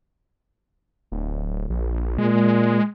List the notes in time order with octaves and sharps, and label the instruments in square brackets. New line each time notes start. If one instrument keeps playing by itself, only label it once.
[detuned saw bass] D1
A#1
[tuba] A#2 [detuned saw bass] G#3